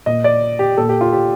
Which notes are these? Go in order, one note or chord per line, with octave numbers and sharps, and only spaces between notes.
A#2 D#5
D5
G4
A#2 A4
G4
F4
G4